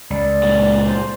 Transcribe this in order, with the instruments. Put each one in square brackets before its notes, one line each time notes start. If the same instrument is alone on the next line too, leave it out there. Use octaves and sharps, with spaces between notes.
[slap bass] C#2 [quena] D5
[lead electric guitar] A#2 G#3
[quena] C5